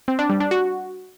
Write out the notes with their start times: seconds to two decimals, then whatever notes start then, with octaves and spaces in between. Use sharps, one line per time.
0.08 C4
0.19 D4
0.30 G3
0.40 D4
0.51 F#4